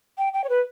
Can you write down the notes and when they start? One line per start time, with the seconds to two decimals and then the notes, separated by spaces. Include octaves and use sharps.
0.18 G5
0.34 G5
0.44 C#5
0.49 B4